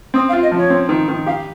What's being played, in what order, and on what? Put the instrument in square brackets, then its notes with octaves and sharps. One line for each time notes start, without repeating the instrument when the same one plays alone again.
[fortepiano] C4 [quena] D#6
[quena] F5
[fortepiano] F4
[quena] D#5
[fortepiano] F3
[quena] C#5
[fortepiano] C4
D#3
D#3
[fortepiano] G4 [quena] F5